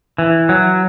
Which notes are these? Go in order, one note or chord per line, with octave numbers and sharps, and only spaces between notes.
E3
F#3